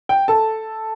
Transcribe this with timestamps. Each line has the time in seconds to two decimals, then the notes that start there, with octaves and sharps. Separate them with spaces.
0.09 G5
0.28 A4 A5